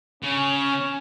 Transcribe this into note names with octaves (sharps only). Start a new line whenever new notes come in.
C#3 C#4